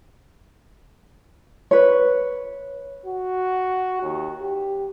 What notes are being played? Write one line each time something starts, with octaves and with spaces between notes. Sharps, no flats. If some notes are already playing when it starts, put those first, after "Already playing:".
B4 C#5
F#4
D#2
G4